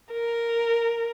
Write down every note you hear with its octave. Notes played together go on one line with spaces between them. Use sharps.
A#4